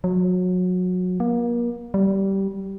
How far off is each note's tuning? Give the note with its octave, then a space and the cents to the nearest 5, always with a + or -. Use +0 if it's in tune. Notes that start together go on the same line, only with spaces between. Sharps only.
F#3 -25
A#3 +35
G3 -15